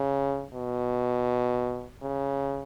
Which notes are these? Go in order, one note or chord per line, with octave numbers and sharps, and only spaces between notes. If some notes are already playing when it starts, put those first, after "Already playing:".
Already playing: C#3
B2
C#3